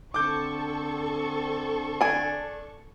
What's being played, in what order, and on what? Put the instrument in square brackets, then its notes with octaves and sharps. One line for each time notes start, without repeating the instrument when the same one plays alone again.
[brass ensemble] D3 C4 [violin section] A4 C#6 [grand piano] D6 G6
[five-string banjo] D4 G#5